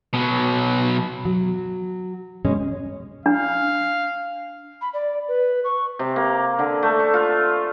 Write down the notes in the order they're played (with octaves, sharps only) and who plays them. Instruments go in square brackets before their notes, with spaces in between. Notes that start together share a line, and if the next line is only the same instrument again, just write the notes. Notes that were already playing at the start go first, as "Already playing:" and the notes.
[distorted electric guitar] B2 F#3
[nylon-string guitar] F#3
B2 G#3 C#4
[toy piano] D4 [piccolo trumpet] F5
[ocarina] B5
D5
B4
C#6
[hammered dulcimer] C3
A#3
D3
A3
C#6
F4